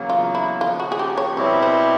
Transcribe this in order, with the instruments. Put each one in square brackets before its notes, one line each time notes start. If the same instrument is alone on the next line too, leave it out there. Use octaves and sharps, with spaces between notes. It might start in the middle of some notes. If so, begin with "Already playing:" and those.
Already playing: [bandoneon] E2 C#3 F#3 A#3
[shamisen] F4
E4
[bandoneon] D#2 C#3 F3 [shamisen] F4
[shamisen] F#4
G#4
G4
C#5
[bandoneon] B2 G3 C4 E4 G4 [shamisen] C#5
[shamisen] C5